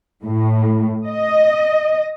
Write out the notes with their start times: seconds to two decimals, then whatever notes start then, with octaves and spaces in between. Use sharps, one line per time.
0.24 A2
1.08 D#5